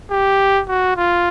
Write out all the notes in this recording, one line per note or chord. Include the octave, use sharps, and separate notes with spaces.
G4
F#4
F4